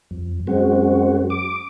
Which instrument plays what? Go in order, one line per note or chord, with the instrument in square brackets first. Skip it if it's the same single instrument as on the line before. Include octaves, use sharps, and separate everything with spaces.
[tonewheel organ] F2
[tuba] F#2 [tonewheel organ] G#3 C4 F#4
[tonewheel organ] D6